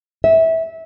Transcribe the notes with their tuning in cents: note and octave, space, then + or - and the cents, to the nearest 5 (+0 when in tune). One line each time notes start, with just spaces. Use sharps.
E5 -20